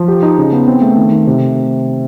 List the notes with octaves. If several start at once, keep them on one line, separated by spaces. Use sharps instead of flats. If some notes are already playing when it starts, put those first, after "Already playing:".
Already playing: F3
G4
D#4
C#3
B3
C4
A3
D#3
D#3
C3